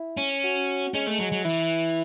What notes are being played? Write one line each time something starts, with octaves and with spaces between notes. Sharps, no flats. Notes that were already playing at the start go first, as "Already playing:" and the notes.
Already playing: E4
C#4
F#4
G#3 C#4
A3
F#3
F#3
E3 E4